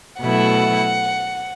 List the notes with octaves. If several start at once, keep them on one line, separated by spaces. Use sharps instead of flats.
B2 F#3 A3 E4 F#5